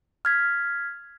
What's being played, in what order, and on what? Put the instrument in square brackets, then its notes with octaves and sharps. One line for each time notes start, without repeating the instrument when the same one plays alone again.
[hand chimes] F6 G#6 B6